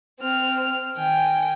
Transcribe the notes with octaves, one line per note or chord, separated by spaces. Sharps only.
C4 F6
D#3 G5 G#5